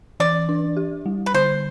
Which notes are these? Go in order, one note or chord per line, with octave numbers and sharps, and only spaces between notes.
E3 D5
D4
G4
G3
B4
D3 C5